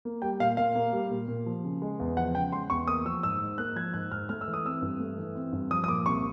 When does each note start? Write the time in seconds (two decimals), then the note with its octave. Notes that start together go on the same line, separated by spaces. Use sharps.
0.05 A#3
0.22 G3 G5
0.40 A#2 F5
0.57 A#2 F5
0.75 A#3
0.93 G3
1.11 A#2
1.28 A#2
1.46 F3
1.64 C#3
1.82 G#3
2.00 E2
2.17 F3 F#5
2.35 C#3 G5
2.52 G#3 C6
2.70 E2 C#6
2.88 A#3 D#6
3.05 F3 E6
3.23 G#2 E6
3.41 G#2
3.58 A#3 F#6
3.76 F3 G#6
3.94 G#2 F#6
4.12 G#2 F6
4.29 A3 F6
4.41 E6
4.47 E3
4.54 D#6
4.65 C4 E6
4.82 G2
5.00 A3
5.18 E3
5.35 C4
5.53 G2
5.70 F3 D#6
5.84 D#6
5.88 A#2 D6
6.06 C2 C#6